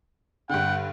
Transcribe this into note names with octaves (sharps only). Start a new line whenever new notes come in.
G2 D3 F#5 G5